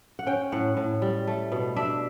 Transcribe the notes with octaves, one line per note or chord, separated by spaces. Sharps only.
F#5
C#4 G5
A2 F#5
A2
G3
A3
B2
D4 E5